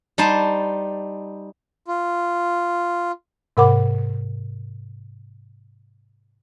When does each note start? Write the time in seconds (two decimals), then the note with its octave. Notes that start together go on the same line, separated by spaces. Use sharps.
0.18 G3 D#4 C5 A5
1.88 F4
3.57 G#2 C3 A#4 F#5 B5 D6